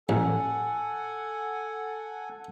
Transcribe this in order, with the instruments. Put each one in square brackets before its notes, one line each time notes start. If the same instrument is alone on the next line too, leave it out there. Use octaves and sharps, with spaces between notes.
[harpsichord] A1 [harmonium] A4 F#5 G#5